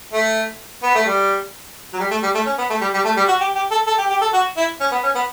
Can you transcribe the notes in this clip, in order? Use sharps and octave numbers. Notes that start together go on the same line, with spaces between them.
A3
B3
A3
G3
F#3
G3
A3
G3
A3
C#4
B3
A3
G3
G3
A3
G3
F#4
G4
G4
A4
A4
G4
G4
A4
F#4
E4
C#4
B3
C#4
B3